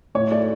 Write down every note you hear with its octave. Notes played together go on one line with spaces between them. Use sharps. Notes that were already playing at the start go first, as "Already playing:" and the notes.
A2 C#5
A3 D5